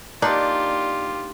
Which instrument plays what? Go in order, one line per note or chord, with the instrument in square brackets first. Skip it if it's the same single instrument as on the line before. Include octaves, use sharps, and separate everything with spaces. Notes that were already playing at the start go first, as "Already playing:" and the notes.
[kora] A#3 D4 D#4 [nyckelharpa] F4 G4 [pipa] D5